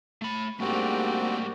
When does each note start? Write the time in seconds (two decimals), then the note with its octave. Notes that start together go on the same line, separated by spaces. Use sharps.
0.22 A3 B5
0.60 G#2 G3 A3 A#3 C4 D4 F#4 G4